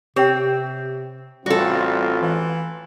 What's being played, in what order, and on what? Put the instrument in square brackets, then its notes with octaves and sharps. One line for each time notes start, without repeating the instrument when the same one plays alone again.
[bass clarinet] C3 [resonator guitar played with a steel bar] C4 [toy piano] G4 C#5 G5
[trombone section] A1 C4 F4 [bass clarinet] G3 [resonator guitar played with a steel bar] F#4 A4
[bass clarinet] E3